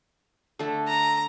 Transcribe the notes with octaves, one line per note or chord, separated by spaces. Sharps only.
D3 A3
A#5